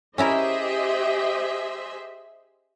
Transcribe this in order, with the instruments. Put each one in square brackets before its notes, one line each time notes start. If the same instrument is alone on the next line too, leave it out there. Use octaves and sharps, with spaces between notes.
[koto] C#4 E4 A#4 [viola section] G4 D#5 [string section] G#4 C5 E5